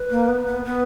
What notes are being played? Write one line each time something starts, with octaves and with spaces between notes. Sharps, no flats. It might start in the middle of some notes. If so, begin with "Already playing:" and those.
Already playing: B4
A#3
B3
B3
B3 B4